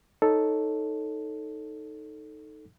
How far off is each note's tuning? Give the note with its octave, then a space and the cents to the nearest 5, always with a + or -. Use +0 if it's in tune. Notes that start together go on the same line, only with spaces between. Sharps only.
D#4 +0 A4 +0 C#5 +0